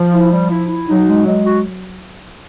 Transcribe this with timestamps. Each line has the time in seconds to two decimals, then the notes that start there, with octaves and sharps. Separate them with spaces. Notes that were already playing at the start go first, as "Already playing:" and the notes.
Already playing: F3
0.12 E4
0.31 G3
0.50 E4
0.69 E4
0.87 F#3 D#4
1.07 G#3
1.26 G#3
1.45 F#4